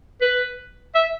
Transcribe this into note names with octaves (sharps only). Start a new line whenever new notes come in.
B4
E5